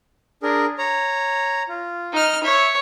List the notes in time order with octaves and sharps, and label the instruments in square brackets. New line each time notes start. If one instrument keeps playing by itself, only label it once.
[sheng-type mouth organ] D4 G#4 A#4
C#5 A#5
F4
[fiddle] D#4 F6
[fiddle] C#5 [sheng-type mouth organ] E5 B5 E6